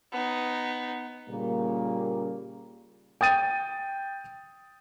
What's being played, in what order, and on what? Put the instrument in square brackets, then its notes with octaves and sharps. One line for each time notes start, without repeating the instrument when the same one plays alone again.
[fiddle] B3 D#4
[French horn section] A#2 C#3 G3 A#3
[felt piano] G5 D#6 A6 D#7